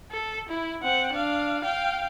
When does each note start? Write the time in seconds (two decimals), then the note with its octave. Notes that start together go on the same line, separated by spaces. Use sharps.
0.11 A4
0.49 E4
0.82 C4 F#5
1.12 D4 F5
1.62 F5 G5